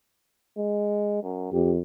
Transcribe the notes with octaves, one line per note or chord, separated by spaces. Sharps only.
G#3
F#2
F2 G4